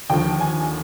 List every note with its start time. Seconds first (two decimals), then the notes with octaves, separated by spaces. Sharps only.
0.10 D#2 D3 F3 G5
0.40 G#5